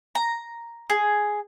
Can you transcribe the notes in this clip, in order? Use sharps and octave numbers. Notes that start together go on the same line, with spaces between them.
A#5
G#4